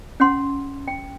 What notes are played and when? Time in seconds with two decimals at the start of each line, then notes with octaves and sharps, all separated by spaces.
0.20 C#4 F#5 C6
0.88 G5